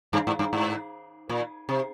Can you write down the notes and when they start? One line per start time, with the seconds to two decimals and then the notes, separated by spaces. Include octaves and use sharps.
0.13 G2
0.27 G#2
0.39 G2
0.53 G#2
1.29 A#2
1.69 C3